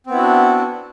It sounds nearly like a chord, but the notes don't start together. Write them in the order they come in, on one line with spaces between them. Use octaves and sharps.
C4 B3 E4 F#4 D4